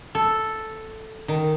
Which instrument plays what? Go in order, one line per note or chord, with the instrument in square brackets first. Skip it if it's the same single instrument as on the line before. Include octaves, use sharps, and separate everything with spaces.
[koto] A4
D#3